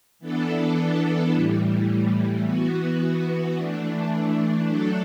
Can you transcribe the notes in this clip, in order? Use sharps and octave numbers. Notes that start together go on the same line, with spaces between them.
E3 B3 D4 A4
A2 E3 G3
E3 B3 F#4
E3 A3 D4
F#3 A3 D4 A4